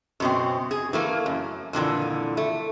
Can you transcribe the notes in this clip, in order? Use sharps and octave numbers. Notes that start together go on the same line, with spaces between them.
F#2 B2 C4
G#4
E3 A3 A#3
F#2
F2 A#2 D3 E3
A3